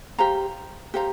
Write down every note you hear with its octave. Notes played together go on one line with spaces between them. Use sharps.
G4 C5 F5 A#5
G4 C5 F5 A#5